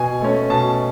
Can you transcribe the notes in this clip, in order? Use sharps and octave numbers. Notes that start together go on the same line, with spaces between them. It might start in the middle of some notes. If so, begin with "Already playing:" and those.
Already playing: B2 G#5
A3 C#4
B2 A5